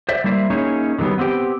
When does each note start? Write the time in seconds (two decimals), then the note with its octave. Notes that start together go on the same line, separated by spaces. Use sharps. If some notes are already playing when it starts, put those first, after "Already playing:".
0.09 C5 D5 E5
0.24 G3 A#3 E4 C5 E5
0.50 A#3 C#4 D#4 E4 G#4 C#5
0.99 D3 D#3 F#3 G3 B3
1.18 B3 C4 E4 G4 G5